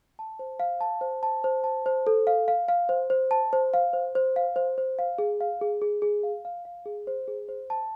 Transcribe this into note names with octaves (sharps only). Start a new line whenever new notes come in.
A5
C5
F5
A5
C5
A5
C5
A5
C5
A4
F5
F5
F5
C5
C5
A5
C5
F5
C5
C5
F5
C5
C5
F5
G#4
F5
G#4
G#4
G#4
F5
F5
F5
G#4
C5
G#4
C5
A5